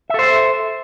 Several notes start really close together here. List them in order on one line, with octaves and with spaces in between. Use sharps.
E5 A4 C5